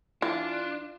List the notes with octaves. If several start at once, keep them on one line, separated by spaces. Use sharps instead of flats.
E3 D4 F4